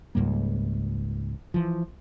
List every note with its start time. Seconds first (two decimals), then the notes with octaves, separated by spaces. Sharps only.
0.15 C#2 G#2 G3 A#3
1.54 E3 F3